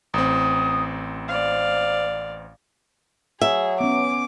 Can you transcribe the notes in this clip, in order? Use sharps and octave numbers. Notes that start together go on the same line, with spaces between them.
A1 C4 D#6
C5 D5 F5
F#3 G#4 E5
B3 C#4 D6